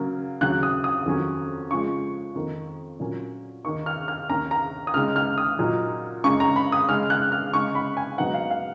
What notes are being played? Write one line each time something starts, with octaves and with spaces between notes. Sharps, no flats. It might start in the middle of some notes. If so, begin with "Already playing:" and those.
Already playing: C#3 F#3 A#3
D#2 C#3 F#3 F#6
D#6
D#6
F2 D#3 F#3 C#4
C#3 F3 G#3 C#6
F2 D#3 A#3 D#4
A#2 F#3 A#3 C#4
D#2 D#3 A#3 D#4 C#6
F6
F6
D#2 D#3 A#3 C#4 A#5
A#5
D#6
C#2 C#3 G#3 D#4 F6
F6
D#6
A#2 F#3 A#3 D#4
F#2 C#3 G#3 D#4 C#6
A#5
B5
D#6
C#3 G#3 D#4 F6
F#6
F6
C#3 G#3 D#4 C#6
B5
G#5
G#2 F#3 B3 D#4 F#5
F5
F5